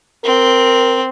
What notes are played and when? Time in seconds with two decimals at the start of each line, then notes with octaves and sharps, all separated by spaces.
0.24 C4 A#4